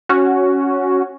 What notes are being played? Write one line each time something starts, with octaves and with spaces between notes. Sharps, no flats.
C#4 F#4